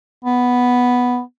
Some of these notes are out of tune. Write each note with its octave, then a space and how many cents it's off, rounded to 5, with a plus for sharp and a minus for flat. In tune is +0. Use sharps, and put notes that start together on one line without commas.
B3 +0